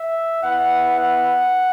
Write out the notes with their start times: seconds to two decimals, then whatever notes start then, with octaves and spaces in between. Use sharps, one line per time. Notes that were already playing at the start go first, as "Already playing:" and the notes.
Already playing: E5
0.42 B3 E4 F#5
1.00 F#5